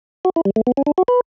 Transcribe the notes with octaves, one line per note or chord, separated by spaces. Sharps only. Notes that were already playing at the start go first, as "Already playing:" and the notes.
F#4
E4
G3
A3
B3
C#4
D4
F#4
B4